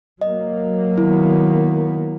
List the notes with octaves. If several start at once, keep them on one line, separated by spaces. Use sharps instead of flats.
F#3 A#3 D#5
D#3 B3 E4